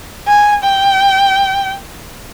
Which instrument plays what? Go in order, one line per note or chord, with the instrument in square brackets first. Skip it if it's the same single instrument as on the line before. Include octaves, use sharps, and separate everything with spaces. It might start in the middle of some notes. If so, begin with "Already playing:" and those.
[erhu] G#5
G5